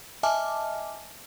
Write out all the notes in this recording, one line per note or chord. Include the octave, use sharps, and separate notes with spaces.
D#5 E5 G#5 A5 D6 F6